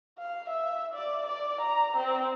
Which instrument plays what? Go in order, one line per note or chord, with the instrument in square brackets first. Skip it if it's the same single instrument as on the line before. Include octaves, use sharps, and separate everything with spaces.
[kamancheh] F5
E5
D5
D5
A#5
C4